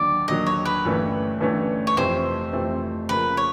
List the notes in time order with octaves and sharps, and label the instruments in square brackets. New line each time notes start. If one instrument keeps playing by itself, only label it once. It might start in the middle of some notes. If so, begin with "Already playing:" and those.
Already playing: [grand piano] D#2 D3 F#3 [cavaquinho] D5
[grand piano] D#2 D3 F#3 [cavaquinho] D#5
[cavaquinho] C#5
B4
[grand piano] G1 G2 E3 A3 C#4
G1 G2 E3 A3 C#4
[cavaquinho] C#5
[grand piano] F2 C3 E3 A3 C4 [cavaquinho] C5
[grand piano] F2 C3 E3 A3 C4
[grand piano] C#3 F3 A#3 [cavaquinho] B4
[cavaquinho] C#5